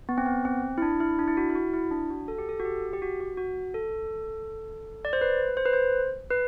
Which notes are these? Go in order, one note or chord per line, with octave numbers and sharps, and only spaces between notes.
B3
C4
B3
C4
E4
D4
E4
D4
E4
F#4
E4
F#4
E4
D4
F#4
A4
G4
A4
F#4
G4
G4
F#4
F#4
F#4
A4
D5
C5
B4
C5
B4
C5
B4